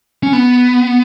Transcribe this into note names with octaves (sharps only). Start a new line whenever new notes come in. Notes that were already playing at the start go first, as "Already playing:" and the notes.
C#4
B3